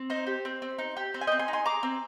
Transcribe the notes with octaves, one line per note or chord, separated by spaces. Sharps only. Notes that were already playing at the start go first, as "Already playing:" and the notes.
Already playing: C4
D#4 C5
G4
C4
C4
D#4
G4
C4 C5
G#5
D#5 G5
C4
G#5 C6
D#4
G#5 C6
G#4 A#5 D6
C4